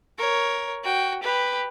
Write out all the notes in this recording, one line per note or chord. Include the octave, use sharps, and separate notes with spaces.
A#4 C#5
F#4 G5
G4 B4